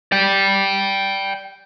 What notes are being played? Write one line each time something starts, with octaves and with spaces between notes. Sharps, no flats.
D5 G5